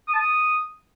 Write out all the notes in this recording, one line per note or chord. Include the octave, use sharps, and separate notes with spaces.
D#6
A5
D#6